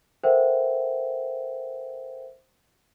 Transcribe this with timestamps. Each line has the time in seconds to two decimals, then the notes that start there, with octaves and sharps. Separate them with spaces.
0.24 A4 A#4 C5 E5 F#5 G5